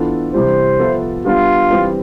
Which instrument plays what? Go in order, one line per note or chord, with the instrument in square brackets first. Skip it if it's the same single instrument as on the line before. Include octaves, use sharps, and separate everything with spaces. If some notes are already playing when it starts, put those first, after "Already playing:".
Already playing: [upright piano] E3 B3 D4 F4 A4
[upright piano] C3 E3 G3 [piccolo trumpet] C5
[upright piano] F3 B3 F4 A4 E5
[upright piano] G3 B3 D4 G4 [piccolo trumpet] F4
[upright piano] E3 G3 C4 G4 B4